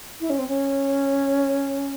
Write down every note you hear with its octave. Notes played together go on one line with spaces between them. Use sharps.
E4
C#4
C4
C#4